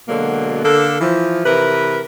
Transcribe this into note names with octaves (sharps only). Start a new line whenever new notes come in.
B2 D3 F#3 G#3 A#3
D3 A#3 A4
E3 F3
C3 E3 A#4 B4